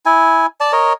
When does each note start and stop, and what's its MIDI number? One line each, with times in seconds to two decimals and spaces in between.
0.06 0.46 64
0.06 0.46 80
0.60 0.72 74
0.60 0.72 81
0.72 0.93 70
0.72 0.93 73
0.72 0.93 75